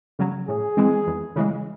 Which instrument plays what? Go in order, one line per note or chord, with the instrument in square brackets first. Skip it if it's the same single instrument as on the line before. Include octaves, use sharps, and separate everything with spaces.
[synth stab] C#3 F#3
[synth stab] A2 [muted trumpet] G#4
[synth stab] E3 G#3 C4
E2
C#3 E3 G#3